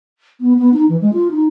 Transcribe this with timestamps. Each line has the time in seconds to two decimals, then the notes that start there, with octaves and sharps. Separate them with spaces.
0.40 B3
0.58 B3
0.73 D#4
0.89 E3
1.01 G#3
1.13 F4
1.31 D#4